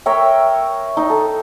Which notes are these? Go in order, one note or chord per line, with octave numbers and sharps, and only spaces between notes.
A#4 C#5 E5 G5
D#4
A4